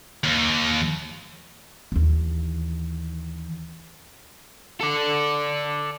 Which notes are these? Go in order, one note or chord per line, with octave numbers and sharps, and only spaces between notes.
D#2
D#2 E3
A4 D5